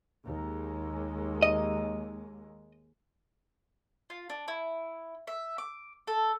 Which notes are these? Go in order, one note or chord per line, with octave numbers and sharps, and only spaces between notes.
D#2 G#3
D#5
F4
D4
E4
E5
D6
A4